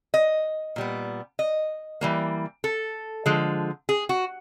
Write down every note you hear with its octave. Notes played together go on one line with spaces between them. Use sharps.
D#5
A#2 G3 B3
D#5
E3 G3 A#3
A4
D3 F3 G#3
G#4
F#4